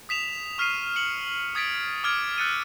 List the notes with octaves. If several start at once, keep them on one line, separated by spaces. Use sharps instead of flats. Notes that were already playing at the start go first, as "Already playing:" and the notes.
D#6 B6 E7 F7
C#6 F6 B6 C7 D#7
C#7 E7 F#7
D#6 G#6 A6 B6 D7
D6 F6 G#6 D7
E6 F#6 A6 C#7 D#7